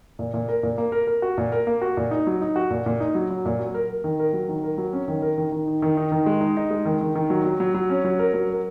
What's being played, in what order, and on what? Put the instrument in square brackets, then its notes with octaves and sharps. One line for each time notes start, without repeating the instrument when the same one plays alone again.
[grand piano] A#2
A#2
A#4
A#2
A#3
A#4
A#4
F#4
A#2
A#4
A#3
F#4
A#2
D#4
F#3
D#4
F#4
A#2
A#2
D#4
F#3
F#3
A#2
F#3
A#4
A#4
D#3
A#4
F#3
D#3
A#4
F#3
C#4
D#3
A#4
D#3
D#3
D#4
D#3
D#4
D#3
G#3
D#4
D#4
G#3
D#3
D#3
D#3
F#3
F#3
F#3
F#3
C#4
F#3
A#4
F#3
A#4